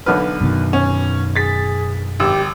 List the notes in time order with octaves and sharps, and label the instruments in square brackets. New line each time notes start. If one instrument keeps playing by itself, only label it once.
[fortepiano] B1 D3 F6 [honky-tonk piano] B4
[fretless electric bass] F#2 B2 D#3
[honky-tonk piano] C#4
[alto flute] G#4 [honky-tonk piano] A6 B6
[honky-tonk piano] G#1 E6 [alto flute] G4